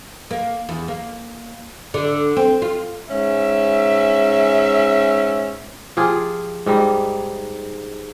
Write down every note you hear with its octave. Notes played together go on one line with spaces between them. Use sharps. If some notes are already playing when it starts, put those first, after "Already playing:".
A#3
E2
A#3
D3
C4
F4
G#2 C#4 E5
F3 F4 G4 G#4
G#2 G3 D#4